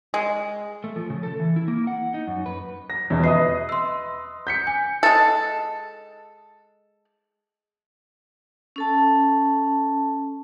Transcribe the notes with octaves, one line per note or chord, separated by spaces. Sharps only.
G#3
A3
F3
C#3
A4
E3
E4
A#3
F#5
D#4
F#2
B4
A#6
E2 B2
B4 D#5 E5 D#6 C7
C6 E6
G6 B6 C#7
G#5
G#3 A4
C#4 A4 A5